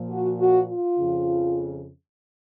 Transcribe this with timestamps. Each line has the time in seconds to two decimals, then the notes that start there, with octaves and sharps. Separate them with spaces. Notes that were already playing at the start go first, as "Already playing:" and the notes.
Already playing: A#2 F3
0.10 F#4
0.38 F#4
0.68 F4
0.97 F2 C#3 F3